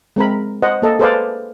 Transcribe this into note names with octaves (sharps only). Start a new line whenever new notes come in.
G#3 C4 A#4 B5
C5 D#5 F#5
A#3 A4 D#5
G#4 A4 B4 C5 D5 F5